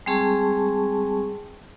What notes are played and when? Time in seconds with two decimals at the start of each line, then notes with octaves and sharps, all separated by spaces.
0.06 G3 G#3 C4 G#4 A5 C#6